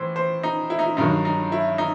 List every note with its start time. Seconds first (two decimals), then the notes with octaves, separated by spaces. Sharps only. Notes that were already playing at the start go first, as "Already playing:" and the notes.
Already playing: A2 E3 C5
0.16 C5
0.43 D#4
0.70 E4
0.79 D#4
0.86 E4
0.97 G2 D#3 F#3 D#4
1.25 D#4
1.52 E4
1.78 D#4